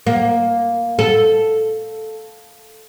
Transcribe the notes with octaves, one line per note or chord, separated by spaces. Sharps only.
A#3
A4